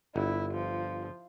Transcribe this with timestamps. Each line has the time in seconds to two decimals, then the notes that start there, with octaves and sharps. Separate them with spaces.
0.16 G1 E4
0.54 F3